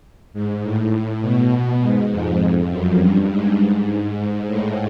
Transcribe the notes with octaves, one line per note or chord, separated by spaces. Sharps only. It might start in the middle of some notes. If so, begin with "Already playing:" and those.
G#2
A2
B2
G#2
F2
F#2
G2
G#2
G#2
A2